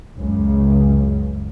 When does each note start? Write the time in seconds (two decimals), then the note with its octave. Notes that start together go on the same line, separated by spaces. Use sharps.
0.16 C#2 F#2 C#3